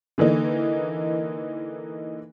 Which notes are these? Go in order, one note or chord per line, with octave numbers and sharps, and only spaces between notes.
D3 E3 A#3 D#4